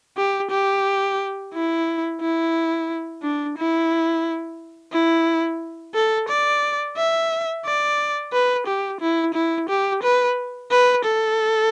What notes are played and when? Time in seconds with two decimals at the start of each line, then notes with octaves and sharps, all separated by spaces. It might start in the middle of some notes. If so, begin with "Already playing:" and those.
0.17 G4
0.51 G4
1.54 E4
2.21 E4
3.23 D4
3.58 E4
4.93 E4
5.94 A4
6.28 D5
6.97 E5
7.65 D5
8.33 B4
8.67 G4
9.01 E4
9.34 E4
9.69 G4
10.03 B4
10.71 B4
11.04 A4